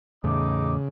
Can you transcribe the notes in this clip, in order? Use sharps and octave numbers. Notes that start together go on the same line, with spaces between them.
E2 A2 C#3 D#4 D6